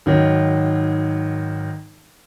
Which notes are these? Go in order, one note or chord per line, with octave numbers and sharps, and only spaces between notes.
G#1 D#3 F#3